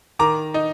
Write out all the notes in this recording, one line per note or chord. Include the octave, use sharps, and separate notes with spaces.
D#3 A#5 D6
D#4